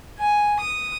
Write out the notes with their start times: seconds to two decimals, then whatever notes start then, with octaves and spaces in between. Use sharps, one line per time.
0.18 G#5
0.61 D#6